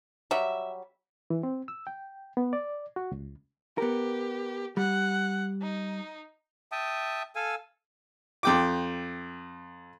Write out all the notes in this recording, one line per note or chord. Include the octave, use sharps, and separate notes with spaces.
F#3 G3 E5
E3
C4
E6
G5
B3
D5
F#4
C#2
B3 G4 A#4
G3 F#5
D#4
E5 G5 A5 D#6
A4 F5 G#5 E6
F2 G5 D6